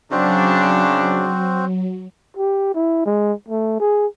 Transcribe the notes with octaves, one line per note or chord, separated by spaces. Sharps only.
C#3 F#3 C4 D4 F#4 C5
G4
E4
G#3
A3
G#4